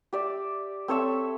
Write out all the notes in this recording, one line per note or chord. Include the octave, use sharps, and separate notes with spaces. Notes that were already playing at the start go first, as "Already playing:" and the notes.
G4 D5 E5
C4 A4 C#5 E5